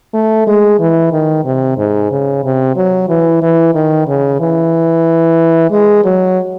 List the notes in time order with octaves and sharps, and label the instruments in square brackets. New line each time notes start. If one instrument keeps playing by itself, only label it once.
[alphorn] A3
G#3
E3
D#3
C3
G#2
C#3
C3
F#3
E3
E3
D#3
C#3
E3
G#3
F#3